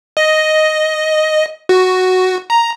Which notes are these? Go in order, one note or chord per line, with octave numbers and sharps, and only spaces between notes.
D#5
F#4
A#5